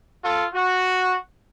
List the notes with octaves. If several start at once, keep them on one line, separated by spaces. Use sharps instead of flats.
F4 A4
F#4